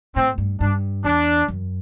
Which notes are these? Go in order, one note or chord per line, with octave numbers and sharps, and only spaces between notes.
A2 C4
G2
G2 D4
E2 D4
F#2